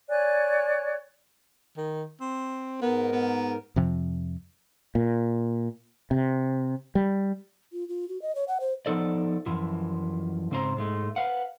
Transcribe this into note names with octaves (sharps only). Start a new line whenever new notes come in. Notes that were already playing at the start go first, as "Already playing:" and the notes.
C#5 D5 G#5 F#6
D#3
C4
G#2 B3 A#4
B3
F2 C3 F3
A#2
C3
G3
F4
F4
F#4
D#5
C#5
F#5
C5
F3 B3 D#4 A4 D5
F#2 E3 F3
G#2 C#3 C4 C5 A#5
G#2 G#3 A3
B4 F5 F#5